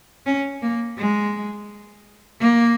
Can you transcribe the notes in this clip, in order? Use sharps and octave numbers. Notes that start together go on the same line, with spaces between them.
C#4
A#3
G#3
A#3